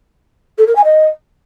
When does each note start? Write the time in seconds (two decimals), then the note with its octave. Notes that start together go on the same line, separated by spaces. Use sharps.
0.58 A4
0.67 A#4
0.75 G#5
0.84 D#5